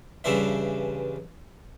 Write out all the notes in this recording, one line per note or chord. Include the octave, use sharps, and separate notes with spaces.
G2 C#3 E3 D4 C5 E5